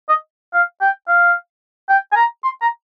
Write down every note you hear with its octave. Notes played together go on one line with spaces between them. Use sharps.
D#5
F5
G5
F5
G5
G#5
A#5
C6
A#5